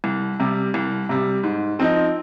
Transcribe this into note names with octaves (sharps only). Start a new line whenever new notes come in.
C2
C3 G3
C2
C3 G3
G#2
F3 C4 D#4